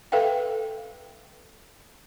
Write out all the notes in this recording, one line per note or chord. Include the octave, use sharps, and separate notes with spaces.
A4 B4 E5 F5 G5